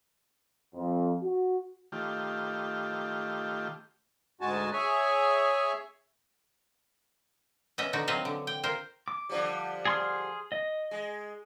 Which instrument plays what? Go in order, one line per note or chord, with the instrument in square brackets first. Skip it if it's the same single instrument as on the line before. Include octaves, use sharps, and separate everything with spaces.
[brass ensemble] F2
F#4
[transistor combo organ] D#3 A3 F4 G4
[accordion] D2 G#2 G#3 F#4 G#5 A5
G#4 C#5 E5 G#5
[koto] B3 C#4 D#5 E5
D3 D#4 F#4
F#3 C4 B4 D#5 F5
D3
G5
F4 A#4 C5
[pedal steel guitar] D6
[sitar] D3 F3 G3
[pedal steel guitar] G#4 C6 F6
D#5
[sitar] G#3